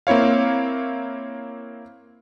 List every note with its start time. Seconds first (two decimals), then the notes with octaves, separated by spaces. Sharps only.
0.07 A#3 C4 E4 C#5 F5